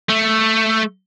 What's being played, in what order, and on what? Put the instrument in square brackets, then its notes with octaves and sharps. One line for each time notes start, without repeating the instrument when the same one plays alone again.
[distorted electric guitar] A3